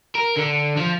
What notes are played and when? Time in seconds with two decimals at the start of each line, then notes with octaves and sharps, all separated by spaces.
0.15 A#4
0.37 D3
0.77 F3